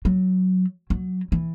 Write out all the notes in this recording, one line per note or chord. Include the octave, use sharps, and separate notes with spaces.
F#3
F#3
E3